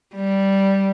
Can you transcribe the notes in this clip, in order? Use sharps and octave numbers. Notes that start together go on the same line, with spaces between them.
G3